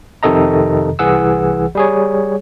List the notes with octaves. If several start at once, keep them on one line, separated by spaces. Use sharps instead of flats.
F2 C3 D#3 A4 D#5 A#5
C2 E3 G#4 F#5 E6
G3 G#4 C#5